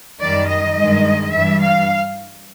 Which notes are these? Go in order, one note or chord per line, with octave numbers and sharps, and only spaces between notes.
F#2 D#3 G3 D5
D#5
G2 D#3 G#3
G2 E3 G3 E5
F5